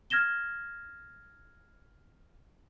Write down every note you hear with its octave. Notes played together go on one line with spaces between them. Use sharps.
F6 G#6 A#6 E7 G7